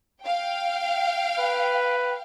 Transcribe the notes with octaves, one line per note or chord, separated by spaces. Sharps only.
F5 G5
B4